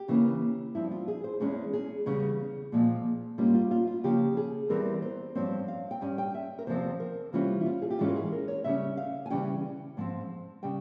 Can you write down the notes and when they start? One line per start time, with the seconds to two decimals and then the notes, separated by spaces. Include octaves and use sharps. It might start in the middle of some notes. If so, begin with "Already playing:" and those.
Already playing: G4
0.08 C#3 E3 A#3 C#4
0.75 G2 F3 C4 E4
0.91 F4
1.08 G#4
1.24 C5
1.40 E2 E3 G#3 C#4 G#4
1.73 G#4
2.06 E2 C#3 G3 C#4
2.72 A#2 F3 G#3 C4
3.38 G#2 G3 A#3 C#4 F4
3.54 F4
3.71 F4
3.87 F4
4.04 C#3 F3 A#3 C#4 G4
4.37 G#4
4.70 E2 E3 G3 C4 A#4
5.02 C5
5.35 G2 F3 C4 C#5
5.68 F5
5.91 G5
6.01 G2 G3 C#4 G#5
6.18 G5
6.34 E5
6.59 A#4
6.67 E2 C3 F3 C4 C5
7.00 A#4
7.33 C3 E3 G3 C#4 F4
7.61 E4
7.66 F4
7.82 G#4
7.90 G4
7.99 G#2 E3 G#3 C#4 F4
8.08 A#4
8.16 G#4
8.32 A#4
8.48 C#5
8.64 C#3 G3 C#4 E5
8.97 F5
9.26 G#5
9.30 C#3 E3 G3 C#4 G5
9.97 G#2 F3 C4
10.63 C#3 G3 G5